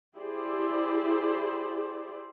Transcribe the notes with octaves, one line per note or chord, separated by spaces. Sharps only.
E4 G4 G#4 C5 D5